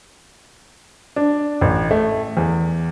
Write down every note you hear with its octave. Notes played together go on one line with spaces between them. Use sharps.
D4
A1
A3
E2